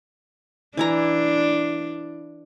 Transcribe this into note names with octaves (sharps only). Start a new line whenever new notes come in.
E3 D4 E4 A#5